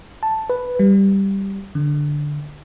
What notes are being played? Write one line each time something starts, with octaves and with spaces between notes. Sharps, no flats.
A5
B4
G3
D3